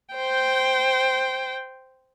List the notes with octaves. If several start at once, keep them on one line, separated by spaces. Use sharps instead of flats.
C5 G5